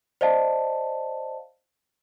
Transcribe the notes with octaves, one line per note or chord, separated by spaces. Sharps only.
C5 D5 D#5 F5 A5